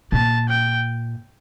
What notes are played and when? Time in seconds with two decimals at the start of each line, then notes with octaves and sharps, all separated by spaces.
0.12 A#2 A5
0.49 G5